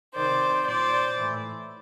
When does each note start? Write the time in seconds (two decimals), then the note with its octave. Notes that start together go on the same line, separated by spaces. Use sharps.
0.15 C3 D#3 C5 D5
0.66 A#2 C5 D5
1.17 A2 E3